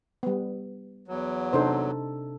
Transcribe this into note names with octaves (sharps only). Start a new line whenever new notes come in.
G3 B3
E2 F#3
C3 D4 D#4 A4 C5